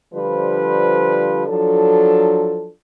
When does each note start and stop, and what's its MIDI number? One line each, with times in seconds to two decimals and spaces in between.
0.14 1.45 50
0.14 1.45 53
0.14 1.45 55
0.14 1.45 65
0.14 1.45 71
0.14 1.45 72
1.47 2.68 53
1.47 2.68 54
1.47 2.68 62
1.47 2.68 69